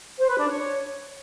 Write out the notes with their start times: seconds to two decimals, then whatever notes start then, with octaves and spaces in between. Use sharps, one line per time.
0.17 C5
0.27 B4
0.38 D4
0.48 C#5